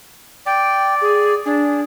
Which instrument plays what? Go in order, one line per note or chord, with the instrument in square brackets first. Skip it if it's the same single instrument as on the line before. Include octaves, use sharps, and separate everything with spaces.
[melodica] D5 [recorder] G5
[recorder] G#4
[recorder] D4 [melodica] G#4